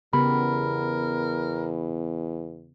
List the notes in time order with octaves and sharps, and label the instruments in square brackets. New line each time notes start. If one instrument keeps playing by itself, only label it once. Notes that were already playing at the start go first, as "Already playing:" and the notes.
[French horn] E2 [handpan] C#3 B3 G4 [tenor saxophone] A#4 [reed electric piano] B5